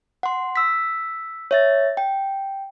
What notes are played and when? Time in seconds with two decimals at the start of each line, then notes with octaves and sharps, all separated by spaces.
0.23 F#5 C6
0.56 E6 B6
1.51 C#5 E5 A6
1.97 G5